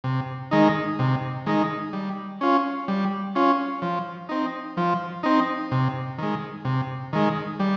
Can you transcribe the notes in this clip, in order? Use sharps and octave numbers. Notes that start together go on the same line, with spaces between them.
C3
D#3 G#3 D#4
C3
D#3 G#3 D#4
G3
C#4 F4
G3
C#4 F4
F3
C4 D#4
F3
C4 D#4
C3
D#3 G#3
C3
D#3 G#3
G3